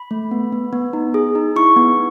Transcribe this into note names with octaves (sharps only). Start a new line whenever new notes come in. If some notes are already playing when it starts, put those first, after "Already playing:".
Already playing: B5
A3
B3
B3
B3
D#4
G#4
D#4
E4 C#6
B3